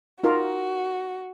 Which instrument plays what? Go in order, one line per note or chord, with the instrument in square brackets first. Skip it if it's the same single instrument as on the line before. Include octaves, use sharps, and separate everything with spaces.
[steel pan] D#4 F4 A#4 [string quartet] F#4